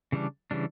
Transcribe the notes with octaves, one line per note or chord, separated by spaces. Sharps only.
C#3 E3 G3 D4
C#3 E3 G3 D4